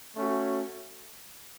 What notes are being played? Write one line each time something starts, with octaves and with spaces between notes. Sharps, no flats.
A3 C#4 F#4